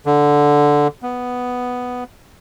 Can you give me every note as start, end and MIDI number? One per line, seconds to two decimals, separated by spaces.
0.06 0.87 50
1.03 2.04 59